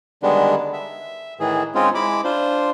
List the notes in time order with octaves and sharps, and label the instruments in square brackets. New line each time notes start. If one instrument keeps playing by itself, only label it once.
[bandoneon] D3 D#3 G3 G#3 B3 D4
E5
A2 D#3 E3 G#4
G#3 C4 C#4 D#4 F4
G#3 E4 B5 D6
D4 F4 C5